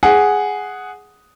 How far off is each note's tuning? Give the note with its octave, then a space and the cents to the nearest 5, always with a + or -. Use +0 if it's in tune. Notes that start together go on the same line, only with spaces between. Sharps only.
G#4 +0 F#5 +0